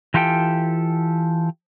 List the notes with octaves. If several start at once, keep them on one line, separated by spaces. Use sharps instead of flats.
E3 F4 G4 A4 G5